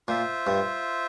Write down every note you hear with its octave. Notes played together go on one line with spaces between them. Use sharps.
A#2 F4 C5 E5
G2